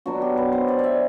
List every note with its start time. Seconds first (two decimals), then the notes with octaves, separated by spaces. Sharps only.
0.06 B2 F#3 B3 D4 F#4
0.22 G4
0.37 B4
0.52 C5
0.68 D5
0.79 D5 E5